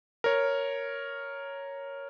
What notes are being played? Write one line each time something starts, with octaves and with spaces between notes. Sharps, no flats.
A#4 C#5